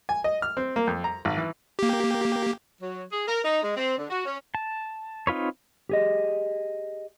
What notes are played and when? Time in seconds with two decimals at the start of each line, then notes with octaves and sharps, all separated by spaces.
0.09 G#5
0.24 D#5
0.42 F6
0.57 C4
0.76 A#3
0.87 F2
1.04 A#5
1.25 G#1
1.37 E3
1.79 A#3 G4
2.82 F#3
3.11 G#4
3.27 A#4
3.45 D#4
3.63 G#3
3.77 C4
3.98 D3
4.10 F#4
4.26 C#4
4.55 A5
5.27 C4 D#4 F4 B4 C#5
5.89 G4 G#4 D#5